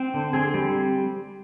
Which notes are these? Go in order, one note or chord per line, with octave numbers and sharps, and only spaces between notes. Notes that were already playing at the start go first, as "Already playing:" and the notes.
Already playing: C4
D3
C4 G#4
G3